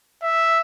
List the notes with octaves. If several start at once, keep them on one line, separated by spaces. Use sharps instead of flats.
E5